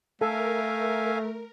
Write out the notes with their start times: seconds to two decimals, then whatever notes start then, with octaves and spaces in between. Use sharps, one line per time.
0.21 A3 A4 A#4 E5 F5 G#5